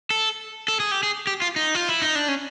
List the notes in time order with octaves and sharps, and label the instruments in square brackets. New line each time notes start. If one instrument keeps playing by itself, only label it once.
[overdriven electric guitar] A4
A4
G#4
G4
G#4
G4
F4
D#4
F4
E4
D#4
D4
C#4